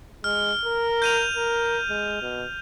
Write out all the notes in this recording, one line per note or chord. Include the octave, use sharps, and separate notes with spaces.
G#3 F6
A#4
G6 D#7 F7
A#4
G#3
B2